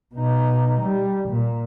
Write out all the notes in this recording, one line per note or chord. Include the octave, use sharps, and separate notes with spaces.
B2 D#4
G3
A#2